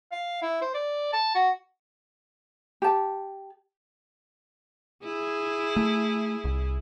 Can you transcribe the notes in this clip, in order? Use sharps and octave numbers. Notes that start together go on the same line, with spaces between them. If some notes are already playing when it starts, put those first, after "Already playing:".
F5
E4
C5
D5
A5
F#4
G4 A5
E4 G#4
A3
C2